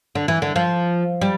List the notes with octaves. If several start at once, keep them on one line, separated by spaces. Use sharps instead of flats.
D3
E3
D3
F3
G3